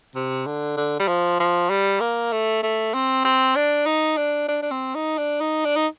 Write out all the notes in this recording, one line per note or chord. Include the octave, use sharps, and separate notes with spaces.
C3
D3
D3
G3
F3
F3
G3
A#3
A3
A3
C4
C4
D4
D#4
D4
D4
D4
C4
D#4
D4
D#4
D4
D#4